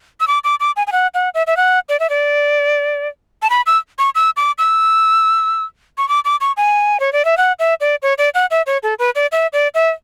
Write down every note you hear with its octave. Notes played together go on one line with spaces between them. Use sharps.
E6
D6
D6
D6
G#5
G#5
F#5
F#5
E5
E5
F#5
D5
E5
D5
A5
B5
E6
C#6
E6
D6
E6
C#6
D6
D6
C#6
G#5
C#5
D5
E5
F#5
E5
D5
C#5
D5
F#5
E5
C#5
A4
B4
D5
E5
D5
E5